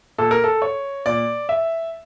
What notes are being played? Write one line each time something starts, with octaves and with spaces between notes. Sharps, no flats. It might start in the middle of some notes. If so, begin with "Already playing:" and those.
A#2 A4
A#4
A4
C#5
A#2 D5
E5